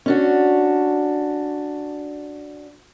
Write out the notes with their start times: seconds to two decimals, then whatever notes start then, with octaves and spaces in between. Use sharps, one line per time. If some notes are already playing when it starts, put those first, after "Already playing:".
0.06 C#4 D4 F#4